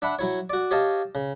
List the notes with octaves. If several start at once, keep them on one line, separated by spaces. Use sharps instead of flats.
D4 E5 F#5 B5
F#3 E4 C#5
F#4 D5
G4 C#5 D#5 F5 A5
C#3